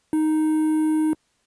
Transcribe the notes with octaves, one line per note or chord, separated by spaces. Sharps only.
D#4